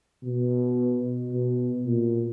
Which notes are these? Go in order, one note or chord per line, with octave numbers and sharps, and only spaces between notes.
B2
B2
A#2